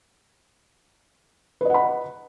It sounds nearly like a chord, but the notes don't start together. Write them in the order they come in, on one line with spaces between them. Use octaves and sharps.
B4 D#5 F#5 B5